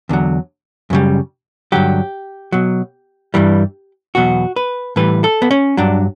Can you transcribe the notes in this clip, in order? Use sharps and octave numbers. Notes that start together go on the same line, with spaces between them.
E2 D3 F#3
F#2 C#3 G3
G2 D3 F#3 G4
B2 F#3
G2 E3 G3
E2 B2 F#3 F#4
B4
A2 E3 G3 B4
A4
B3
C#4
G2 F#3 D4